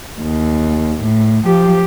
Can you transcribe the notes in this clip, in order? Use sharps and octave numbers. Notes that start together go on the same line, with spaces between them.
D#2
A2
F3 G4